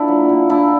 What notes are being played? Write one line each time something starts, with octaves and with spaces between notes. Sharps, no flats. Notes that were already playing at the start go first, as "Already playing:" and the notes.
Already playing: A#2 D4 E4
F#3
A#2
A#2 D4 E4